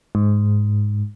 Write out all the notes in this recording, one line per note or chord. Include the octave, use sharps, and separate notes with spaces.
G#2